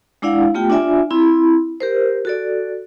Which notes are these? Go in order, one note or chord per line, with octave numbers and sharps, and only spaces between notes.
G#3 D4 E4 D5 F5 F#5
A3 B3 F4 G4 G5
D4 F4 D5 E5 G#5
C4 E4 B5
G4 A#4 C5
F#4 A4 D5